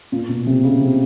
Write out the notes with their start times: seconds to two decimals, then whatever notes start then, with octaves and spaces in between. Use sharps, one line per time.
0.12 A#2
0.29 B2
0.47 C3
0.63 C#3
0.81 C3